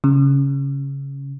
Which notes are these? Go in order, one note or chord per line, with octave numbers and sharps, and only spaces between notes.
C#3